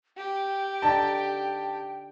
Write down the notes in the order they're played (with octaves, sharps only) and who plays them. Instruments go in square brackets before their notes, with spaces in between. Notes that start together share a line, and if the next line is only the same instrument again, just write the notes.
[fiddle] G4 [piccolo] G5
[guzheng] D3 D#4 [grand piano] A5